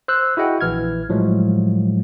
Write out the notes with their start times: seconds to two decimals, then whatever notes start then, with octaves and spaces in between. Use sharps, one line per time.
0.08 C5 E6 F#6
0.37 E4 F#4 G#4 D#5 F#5 G5
0.61 A#1 E3 F6 G#6
1.09 A2 F3 F#3 G#3